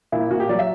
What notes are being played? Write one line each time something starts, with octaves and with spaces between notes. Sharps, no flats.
A#2 E4
A#2 F#4
G4
F#3 D5
E5